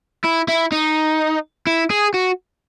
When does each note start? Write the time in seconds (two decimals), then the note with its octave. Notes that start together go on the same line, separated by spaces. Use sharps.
0.24 E4
0.48 E4
0.72 D#4
1.67 E4
1.90 G#4
2.14 F#4